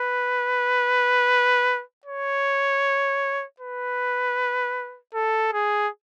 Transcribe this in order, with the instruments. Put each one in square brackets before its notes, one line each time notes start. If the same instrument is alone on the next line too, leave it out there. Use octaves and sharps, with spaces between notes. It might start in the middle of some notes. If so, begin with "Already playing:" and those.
Already playing: [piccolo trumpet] B4
C#5
B4
A4
G#4